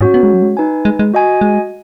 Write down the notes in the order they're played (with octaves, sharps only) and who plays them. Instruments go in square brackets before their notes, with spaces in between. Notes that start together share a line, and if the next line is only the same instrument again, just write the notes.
[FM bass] G#2 [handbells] C#4 F#4 C#5
[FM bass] B3
G#3
F#3
G#3
[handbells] D#4 B4 G#5
[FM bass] G#3
G#3
[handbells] F#4 D#5 G#5
[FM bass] G#3